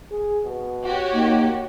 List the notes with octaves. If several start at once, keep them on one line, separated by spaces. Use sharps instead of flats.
G#4
B2
F#4 G4 C#5
A#3 D#4